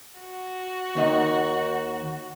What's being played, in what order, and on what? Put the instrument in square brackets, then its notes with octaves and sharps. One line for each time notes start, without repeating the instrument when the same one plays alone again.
[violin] F#4
[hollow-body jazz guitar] D#2 D#3 D#5